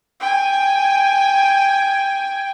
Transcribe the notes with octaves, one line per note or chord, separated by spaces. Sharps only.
G5 G#5